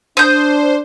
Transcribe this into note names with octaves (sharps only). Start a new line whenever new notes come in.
D4 C5 D#6 G6